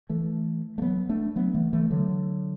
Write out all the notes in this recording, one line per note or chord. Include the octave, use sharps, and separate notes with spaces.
E3 A3
A3
F#3 B3
A3 D4
F#3 B3
E3 A3
E3 A3
D3 F#3